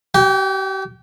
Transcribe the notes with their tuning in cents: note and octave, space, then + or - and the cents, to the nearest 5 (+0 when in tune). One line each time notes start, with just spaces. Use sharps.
G4 -40 G5 +15